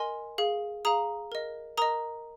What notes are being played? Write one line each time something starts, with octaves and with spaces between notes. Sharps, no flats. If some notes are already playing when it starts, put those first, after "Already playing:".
Already playing: A#4 D#5 G#5 C6
G#4 F5
G#4 F5 A#5 D#6
A#4 D#5
A#4 D#5 A#5 D#6